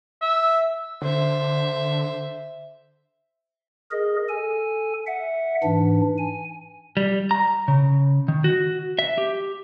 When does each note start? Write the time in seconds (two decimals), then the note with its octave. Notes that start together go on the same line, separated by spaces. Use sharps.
0.22 E5
1.02 D3 C5 E5
3.91 G#4 A#4 D#5
4.29 A4 G#5
5.07 E5 F#5
5.63 G#2 E3 D4
6.18 G#5
6.97 G3
7.31 A#5
7.68 C#3
8.28 D#3
8.44 F#4
8.99 E5
9.18 G4